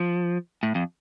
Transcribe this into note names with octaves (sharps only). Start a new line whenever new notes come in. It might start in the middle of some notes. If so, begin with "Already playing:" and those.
Already playing: F3
A2
F2